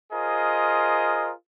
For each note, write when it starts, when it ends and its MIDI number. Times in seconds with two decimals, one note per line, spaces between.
0.13 1.32 65
0.13 1.32 68
0.13 1.32 70
0.13 1.32 72
0.13 1.32 75